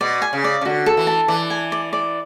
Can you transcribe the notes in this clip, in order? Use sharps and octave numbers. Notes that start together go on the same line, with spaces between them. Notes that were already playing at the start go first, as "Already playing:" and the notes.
B2 D5
G#5
C#3
D5
C#3
D3 F#4
A4
E3
A5
E3 D5
G#5
D5
D5